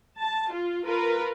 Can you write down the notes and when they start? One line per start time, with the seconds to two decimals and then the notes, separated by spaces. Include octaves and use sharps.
0.18 A5
0.52 F4
0.86 F4 A#4 B4